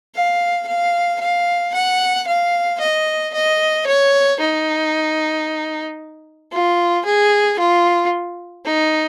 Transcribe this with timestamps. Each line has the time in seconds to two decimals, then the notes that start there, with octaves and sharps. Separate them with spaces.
0.15 F5
0.68 F5
1.21 F5
1.75 F#5
2.28 F5
2.80 D#5
3.34 D#5
3.87 C#5
4.41 D#4
6.53 F4
7.06 G#4
7.60 F4
8.66 D#4